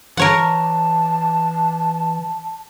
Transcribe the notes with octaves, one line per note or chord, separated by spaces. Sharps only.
E3 A#4 C#5 F#5 A5